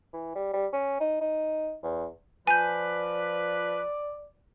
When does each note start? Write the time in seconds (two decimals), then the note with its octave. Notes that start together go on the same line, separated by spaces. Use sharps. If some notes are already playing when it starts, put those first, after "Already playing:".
0.14 E3
0.35 G3
0.53 G3
0.73 C#4
1.01 D#4
1.21 D#4
1.83 E2
2.47 F3 B4 D5 G#5 G6